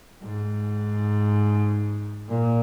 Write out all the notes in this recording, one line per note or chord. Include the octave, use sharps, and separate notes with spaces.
G#2
A#2